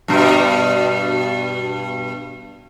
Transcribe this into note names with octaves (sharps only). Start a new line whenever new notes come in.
G2 B2